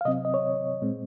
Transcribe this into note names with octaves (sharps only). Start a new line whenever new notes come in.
F5
C3 F#3 C4 D#5
D#5
C#5
A#2 G#3 C4